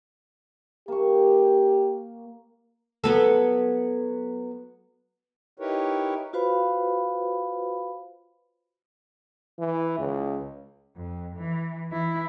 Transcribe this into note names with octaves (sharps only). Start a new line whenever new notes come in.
A#3 G4 C#6
F#3 B3 A4
D#4 E4 G4 A#4 B4 C#5
F4 F#4 B4 C5 F5 B5
E3
C#2
F2
E3
E3 E4